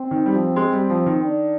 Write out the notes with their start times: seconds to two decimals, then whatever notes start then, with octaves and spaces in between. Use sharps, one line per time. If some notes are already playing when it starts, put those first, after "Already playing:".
Already playing: C4
0.11 D#3
0.26 G3
0.34 F3
0.56 G#3
0.73 G3
0.90 F3
1.06 D#3
1.23 D4